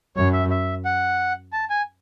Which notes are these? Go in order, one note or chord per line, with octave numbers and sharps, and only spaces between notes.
F#2 C#5
E5
E5
F#5
A5
G#5